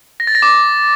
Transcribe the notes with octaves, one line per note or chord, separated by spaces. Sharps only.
A#6
A6
A#6
D6